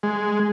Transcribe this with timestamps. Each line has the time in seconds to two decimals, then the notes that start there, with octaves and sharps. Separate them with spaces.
0.03 G#3